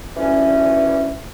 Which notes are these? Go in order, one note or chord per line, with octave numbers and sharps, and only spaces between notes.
D2 G2 E3 C#4